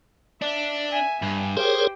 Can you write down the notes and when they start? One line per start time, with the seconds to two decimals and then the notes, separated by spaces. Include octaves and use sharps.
0.42 D4 E5
0.91 E5 G#5
1.22 G2 G#5
1.57 G4 G#4 A#4 C5 C#5 G5